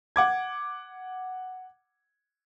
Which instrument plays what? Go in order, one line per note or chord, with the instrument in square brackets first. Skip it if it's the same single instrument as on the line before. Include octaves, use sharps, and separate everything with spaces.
[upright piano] F#5 D6 G#6